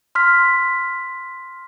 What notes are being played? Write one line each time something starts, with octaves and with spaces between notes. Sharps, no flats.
C6 F6 B6